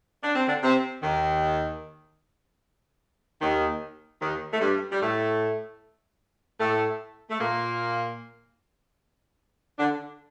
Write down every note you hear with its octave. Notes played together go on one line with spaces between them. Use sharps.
D4
C4
D3 D4
C3 C4
D#2 D#3
D#2 D#3
D#2 D#3
A3
G2 G3
G3
A2 A3
A2 A3
A3
A#2 A#3
D3 D4